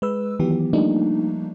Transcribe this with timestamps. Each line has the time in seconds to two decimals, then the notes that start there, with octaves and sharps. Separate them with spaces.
0.02 G#3 B4 E6
0.39 D#3 E3 F#3 B3 G4
0.73 F3 G3 A3 A#3 D4 D#4